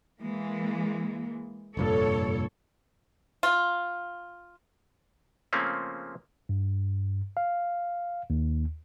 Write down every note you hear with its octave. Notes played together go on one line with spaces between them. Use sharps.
E3 G#3 A#3
F1 G2 A#2 A4 C#5
F4
C#3 F3 A3 A#3 C4 C#4
G2
F5
D#2